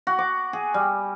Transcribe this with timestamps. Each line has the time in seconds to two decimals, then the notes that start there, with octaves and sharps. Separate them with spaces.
0.07 F#4
0.19 D6
0.53 G#4
0.74 G3